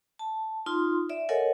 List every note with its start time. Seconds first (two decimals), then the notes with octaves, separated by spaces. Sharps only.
0.19 A5
0.66 D#4 F4 C6
1.10 D5 E5
1.29 A4 A#4 C#5 D#5 F#5 G#5